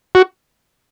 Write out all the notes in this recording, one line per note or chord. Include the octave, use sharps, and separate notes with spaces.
F#4